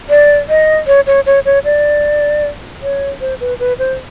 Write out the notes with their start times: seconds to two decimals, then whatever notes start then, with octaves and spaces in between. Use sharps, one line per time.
0.10 D5
0.49 D#5
0.87 C#5
1.07 C#5
1.26 C#5
1.45 C#5
1.65 D5
2.82 C#5
3.21 C5
3.40 B4
3.59 B4
3.79 C5